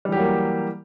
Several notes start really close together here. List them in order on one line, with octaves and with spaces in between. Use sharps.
G3 E3 G4 F#3 A#3